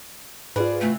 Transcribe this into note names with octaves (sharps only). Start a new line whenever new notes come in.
G#2 F4 G#4 B4 C5 D5
C3 E3 A3